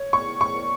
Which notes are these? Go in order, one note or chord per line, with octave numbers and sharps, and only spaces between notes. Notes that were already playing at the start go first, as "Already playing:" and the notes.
Already playing: C#5
C#6
C#6